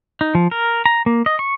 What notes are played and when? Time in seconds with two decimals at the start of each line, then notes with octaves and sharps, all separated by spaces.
0.21 D#4
0.35 F3
0.51 A#4
0.86 A#5
1.06 A#3
1.26 D#5
1.39 C#6